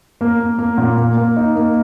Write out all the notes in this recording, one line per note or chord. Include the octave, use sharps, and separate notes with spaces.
A#3
A#3
A#3
A#2
A#3
A#3
D#4
A#3